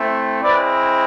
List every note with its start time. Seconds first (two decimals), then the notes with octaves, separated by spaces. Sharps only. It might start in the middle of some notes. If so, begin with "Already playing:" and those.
Already playing: A3 C4 E4
0.42 G#3 C4 E4 B4 D5